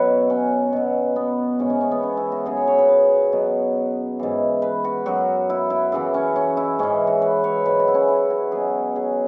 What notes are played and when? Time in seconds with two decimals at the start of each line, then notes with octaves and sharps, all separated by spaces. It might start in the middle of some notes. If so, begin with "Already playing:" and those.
Already playing: F#2 B2 F#3 F#4 B4 C#5 E5
0.30 C#4
0.73 B2 F#3
1.16 B3
1.59 G#2 E3 C#4
1.70 C#4
1.81 C#4
1.91 B3
2.03 C#4
2.17 E4
2.32 F#4
2.46 F#2 C#3 F#3 G#4
2.57 C#5
2.68 C#5
2.78 B4
2.89 B4
3.33 B2 F#3
4.19 G#2 E3
4.62 B4
4.84 F#4
5.06 F#2 F#3 F#4
5.50 E4
5.70 E4
5.92 F#2 C#3 E3 E4
6.14 C#4
6.36 C#4
6.57 E4
6.79 G#2 E3 C#4
7.07 F#4
7.22 B4
7.44 C#5
7.65 G#2 F#3 B4
7.79 F#4
7.88 E4
7.94 C#4
8.08 E4
8.30 F#4
8.52 B2 F#3 G#4
8.96 G#4